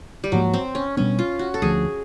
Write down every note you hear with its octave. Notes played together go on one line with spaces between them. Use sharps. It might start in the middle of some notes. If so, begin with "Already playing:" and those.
G3
G#2 F3 F#3 A#3
C4
C#4
B2 G3 B3 C#4 D4
F4
F#4
A4
D2 D3 F3 A3 G#4